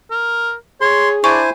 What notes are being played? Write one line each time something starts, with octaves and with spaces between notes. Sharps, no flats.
A#4
G#4 C#5 C6
D4 E4 C5 G#5 C#6